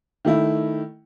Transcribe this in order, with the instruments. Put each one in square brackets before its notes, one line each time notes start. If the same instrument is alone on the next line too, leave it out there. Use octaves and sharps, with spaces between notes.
[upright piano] D#3 A3 E4